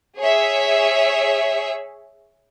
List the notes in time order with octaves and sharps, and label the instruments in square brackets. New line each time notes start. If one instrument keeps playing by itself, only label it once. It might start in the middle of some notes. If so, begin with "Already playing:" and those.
[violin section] G#4 C#5 E5